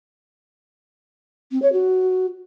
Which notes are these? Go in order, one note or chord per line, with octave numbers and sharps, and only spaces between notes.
C4
C#5
F#4